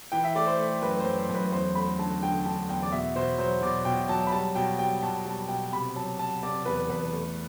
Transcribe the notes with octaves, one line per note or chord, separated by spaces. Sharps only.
E3 G5
E5
A3 D5
C5
A3
F#2 B4
C5
F#2
C5
F#2 B4
E2 C5
A3 B5
D3 A5
D3 G5
D3 A5
E2 G5
D5
B2 E5
B2 C5
F#3 C5
B2 D5
B2 G5
F#3 A5
B5
G3 A5
B2 G5
G3 G5
B2 A5
G3 A5
B2 G5
C3 B5
F#3 A5
F#3 A5
C3 D5
E2 B4
E2 B4
A3